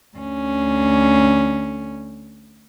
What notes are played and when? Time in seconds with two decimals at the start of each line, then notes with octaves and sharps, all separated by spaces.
0.17 D2 C#4